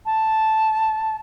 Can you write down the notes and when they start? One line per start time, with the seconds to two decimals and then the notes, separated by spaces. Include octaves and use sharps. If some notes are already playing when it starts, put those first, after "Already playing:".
0.05 A5